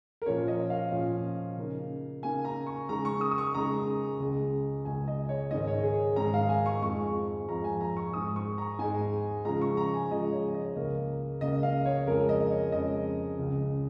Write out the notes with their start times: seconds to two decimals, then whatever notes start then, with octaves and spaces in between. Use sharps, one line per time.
0.22 A#4
0.26 A#2 F3 C#4 C#5
0.48 D#5
0.70 F5
0.92 A#2 F3 C#4
1.57 C#3 A#3 D#4
2.23 C#3 A#3 D#4 G#5
2.44 A#5
2.67 C#6
2.89 C#3 G#3 D#4 A#5
3.05 C#6
3.21 D#6
3.31 D#6
3.38 C#6
3.54 C#3 G#3 D#4 A#5
4.20 C#2 C#3 G#3
4.85 C#2 C#3 G#3 G#5
5.08 D#5
5.29 C#5
5.51 G#2 D#3 G#3 D#5
5.67 C#5
5.84 G#4
6.16 G#2 D#3 G#3 A#5
6.34 F5
6.49 G#5
6.66 C#6
6.82 F2 F3 G#3 C#6
7.48 F2 F3 G#3 A#5
7.64 G#5
7.81 A#5
7.97 C#6
8.13 G#2 G#3 D#4 D#6
8.36 C#6
8.58 A#5
8.79 G#2 G#3 D#4 G#5
9.45 C#3 F3 G#3 A#5
9.62 C#6
9.77 A#5
9.94 G#5
10.11 C#3 F3 G#3 D#5
10.32 C#5
10.54 D#5
10.76 C#2 C#3 A#3
11.41 C#2 C#3 A#3 D#5
11.63 F5
11.86 C#5
12.07 F2 C#3 G#3 A#4
12.29 D#5
12.51 C#5
12.72 F2 C#3 G#3 D#5
13.39 C#2 C#3 G#3